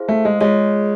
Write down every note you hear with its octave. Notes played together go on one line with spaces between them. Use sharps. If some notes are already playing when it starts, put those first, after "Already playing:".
Already playing: E4 G#4 C5 F5
A3
G#3
G#3 F4 G#4 C#5